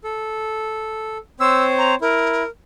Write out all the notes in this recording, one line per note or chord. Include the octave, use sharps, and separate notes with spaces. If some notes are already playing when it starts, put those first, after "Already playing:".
A4
C4 C5 C#5 E6
A#5
E4 A#4